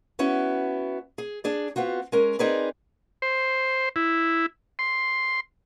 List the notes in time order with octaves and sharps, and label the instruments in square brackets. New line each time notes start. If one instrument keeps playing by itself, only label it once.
[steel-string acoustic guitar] B3 C#4 E4 F#4
G#4
D4 G#4 D5
B3 C4 F4 F#4
G#3 C#4 A#4
C4 D#4 G#4 A#4 B4 D5
[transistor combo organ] C5
E4
C6